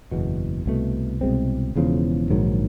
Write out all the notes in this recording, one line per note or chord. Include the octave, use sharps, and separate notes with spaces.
F#1 E2 B2
C2 B2 F#3 A3
C2 B2 G#3 C4
E1 E2 C#3 F3
A#1 G#2 D#3 F#3